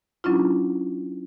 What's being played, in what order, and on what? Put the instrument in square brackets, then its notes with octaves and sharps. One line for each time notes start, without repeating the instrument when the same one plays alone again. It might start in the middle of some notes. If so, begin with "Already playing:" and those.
[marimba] F#3 C#4 D4 E4 F4